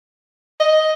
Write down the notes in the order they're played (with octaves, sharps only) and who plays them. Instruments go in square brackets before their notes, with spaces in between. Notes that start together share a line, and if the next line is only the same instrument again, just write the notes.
[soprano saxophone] D#5